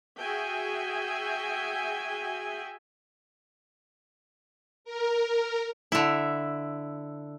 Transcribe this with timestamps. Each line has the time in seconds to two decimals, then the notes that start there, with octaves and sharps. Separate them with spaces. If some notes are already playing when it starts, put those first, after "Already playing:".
0.19 F#4 G#4 E5 G5 G#5
4.85 A#4
5.92 D3 E4